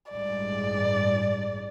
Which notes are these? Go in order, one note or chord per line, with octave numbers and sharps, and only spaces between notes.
A1 G2 G#3 D5